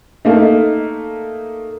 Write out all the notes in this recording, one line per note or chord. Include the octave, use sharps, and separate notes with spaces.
A3 A#3 D#4